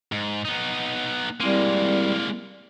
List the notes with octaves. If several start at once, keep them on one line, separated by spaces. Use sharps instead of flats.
G#2
B3 D#4
G3 G#3 A#3 C4 E4 A#4